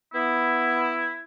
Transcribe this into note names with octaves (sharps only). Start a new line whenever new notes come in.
B3 E4